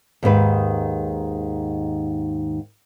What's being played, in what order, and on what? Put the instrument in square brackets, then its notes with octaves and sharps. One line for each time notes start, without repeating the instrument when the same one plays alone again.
[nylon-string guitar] D#2 G#2 D#3 B4